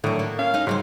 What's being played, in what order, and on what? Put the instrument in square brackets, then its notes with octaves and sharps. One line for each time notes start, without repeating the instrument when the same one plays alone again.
[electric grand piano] A2 [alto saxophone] D3 [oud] D#3 F#3
[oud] A#3
[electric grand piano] C#4 [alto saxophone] F5
[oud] D#4 D#5
[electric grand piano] G#2 [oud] C#3 G3 C5 [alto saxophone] F#3